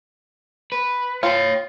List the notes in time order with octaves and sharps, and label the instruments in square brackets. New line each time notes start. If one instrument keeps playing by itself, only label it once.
[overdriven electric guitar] B4
[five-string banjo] F4 [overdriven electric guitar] C#5 G5